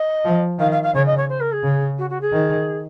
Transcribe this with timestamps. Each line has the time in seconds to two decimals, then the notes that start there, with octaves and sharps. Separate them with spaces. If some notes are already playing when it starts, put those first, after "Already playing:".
Already playing: D#5
0.25 F3
0.59 D#3 F5
0.71 F5
0.83 F5
0.94 C#3 C#5
1.06 D#5
1.17 C#5
1.29 C5
1.40 A#4
1.52 G#4
1.63 C#3
1.98 F#4
2.10 F#4
2.21 G#4
2.32 D#3